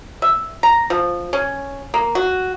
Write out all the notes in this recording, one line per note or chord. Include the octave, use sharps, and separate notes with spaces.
E5
A#5
F3
C#4
A#3
F#4